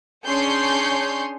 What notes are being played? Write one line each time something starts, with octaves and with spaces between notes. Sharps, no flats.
C#4 D4 G#4 C#5 C6 G6